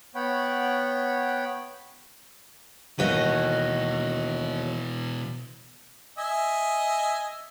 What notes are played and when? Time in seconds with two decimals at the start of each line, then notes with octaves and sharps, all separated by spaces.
0.15 B3 C#5 F#5 G5 B5
2.99 D#2 B2 E3 F#4 D#5
6.18 D#5 E5 G#5